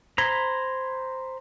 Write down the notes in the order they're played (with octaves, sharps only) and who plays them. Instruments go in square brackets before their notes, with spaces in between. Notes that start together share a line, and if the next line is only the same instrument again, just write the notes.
[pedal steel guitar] C5 A#5 B5 [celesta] G#6 G7